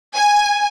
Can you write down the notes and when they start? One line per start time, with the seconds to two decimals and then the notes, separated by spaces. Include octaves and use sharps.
0.16 G#5